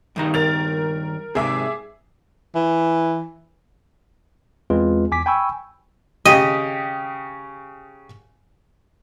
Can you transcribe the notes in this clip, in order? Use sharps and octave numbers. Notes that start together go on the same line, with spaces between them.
G2 D#3 A#5
A#4 A6 F7
G#2 C3 G#4 E5 D6
E3
E2 G#3 C4 F4 B4
E2 G#5 D6 B6
G5 G#5 B5 C#6 E6
C#3 G4 D#5 D#6